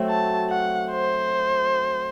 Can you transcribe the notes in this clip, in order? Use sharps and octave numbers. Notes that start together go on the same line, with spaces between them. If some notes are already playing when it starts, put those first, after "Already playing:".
Already playing: F#3 A3 C4 F#4
A5
F#5
C5